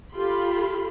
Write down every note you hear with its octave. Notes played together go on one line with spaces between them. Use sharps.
F4 G4 A4 B5 C6